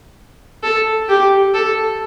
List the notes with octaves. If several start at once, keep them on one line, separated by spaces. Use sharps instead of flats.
A4
G4
A4